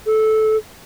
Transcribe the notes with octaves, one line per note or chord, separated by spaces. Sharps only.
A4